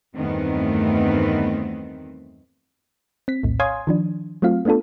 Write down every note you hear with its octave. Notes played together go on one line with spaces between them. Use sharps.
E2 G2 D#3 A3 B3 C4
C4 B6
A#1 D#2 A2
C#5 F5 G#5 C6 D#6 G#6
D#3 F3 D4
F#3 A3 C4 F4 F5
A3 B3 D4 F4 A4